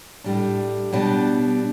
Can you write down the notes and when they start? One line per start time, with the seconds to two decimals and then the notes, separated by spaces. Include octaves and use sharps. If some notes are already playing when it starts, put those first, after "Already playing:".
0.24 A2 G3 D4
0.93 B2 G3 B3 D4